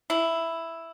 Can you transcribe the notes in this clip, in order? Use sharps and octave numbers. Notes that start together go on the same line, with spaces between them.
E4